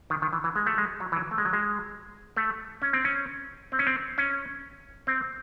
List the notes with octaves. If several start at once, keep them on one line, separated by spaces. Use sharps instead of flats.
D#3
D#3
E3
E3
G#3
A3
G#3
F#3
E3
F#3
A3
G#3
F#3
G#3
A3
C#4
C4
C#4
C4
C#4
C4
C#4
C4